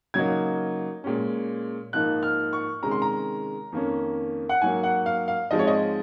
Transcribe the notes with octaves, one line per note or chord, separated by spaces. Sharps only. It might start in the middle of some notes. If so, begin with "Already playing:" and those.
C#3 F#3 A#3 D#4 G#6
A#2 G#3 C#4
G#2 F3 A#3 D#4 F#6
F6
C#6
C3 D#3 G#3 C#4 A#5
C6
A#5
F2 D#3 A#3 C#4
F#5
G#2 F#3 A#3 G#5
F#5
F5
F5
G#2 F3 G#3 C4 D#5
C#5
D#5